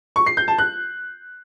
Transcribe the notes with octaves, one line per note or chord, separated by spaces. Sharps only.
C#6
C7
G6
A5
F#6